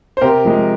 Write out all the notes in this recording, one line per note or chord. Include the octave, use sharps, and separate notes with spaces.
C5
C3 G4 A#4
F3 G#3